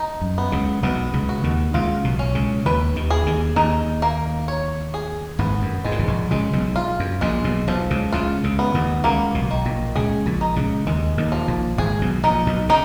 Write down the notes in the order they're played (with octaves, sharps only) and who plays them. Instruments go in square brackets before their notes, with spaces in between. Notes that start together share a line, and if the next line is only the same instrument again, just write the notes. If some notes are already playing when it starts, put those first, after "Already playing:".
Already playing: [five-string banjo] D#4
[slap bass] F#2
[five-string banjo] B3
[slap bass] C#2 C#3
[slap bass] B1 B2 [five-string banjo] B3
[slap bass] C#2 C#3
[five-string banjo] F#4
[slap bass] D#2 D#3
[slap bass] C#2 C#3 [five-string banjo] F4
[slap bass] B1 B2
[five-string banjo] C#4
[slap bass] C#2 C#3
[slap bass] D#2 D#3 [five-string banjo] B4
[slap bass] D#2 D#3
[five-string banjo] G#4
[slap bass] D#2 D#3
[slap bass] D#2 D#3 [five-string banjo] D#4
[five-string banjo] A#3
C#5
G#4
[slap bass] G#1 G#2 [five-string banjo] B3
[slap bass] F#2
[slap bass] G#2 [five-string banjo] G#3
[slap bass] A#2
G#1 G#2
A#1 A#2
[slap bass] C#2 C#3 [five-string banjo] G#3
[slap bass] B1 B2
[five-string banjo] F4
[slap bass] F#2
[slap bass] A#1 A#2 [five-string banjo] G#3
[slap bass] B1 B2
[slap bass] B1 B2 [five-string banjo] F3
[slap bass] C#2 C#3
[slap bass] C#2 C#3 [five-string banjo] F4
[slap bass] C#2 C#3
[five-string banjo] B3
[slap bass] D#2 D#3
[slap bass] C#2 C#3 [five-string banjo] A#3
[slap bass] B1 B2
[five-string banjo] D#3
[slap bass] A#1 A#2
[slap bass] C#2 C#3 [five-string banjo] G#4
[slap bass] A#1 A#2
[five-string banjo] D#4
[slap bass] C#2 C#3
[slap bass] D#2 D#3 [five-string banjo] G#3
[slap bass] D#2 D#3
[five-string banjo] F3
[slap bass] A#1 A#2
[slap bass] G#1 G#2 [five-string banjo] G#4
[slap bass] B1 B2
[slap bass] A#1 A#2 [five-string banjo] D#4
[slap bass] B1 B2
[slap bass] C#3 [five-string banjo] D#4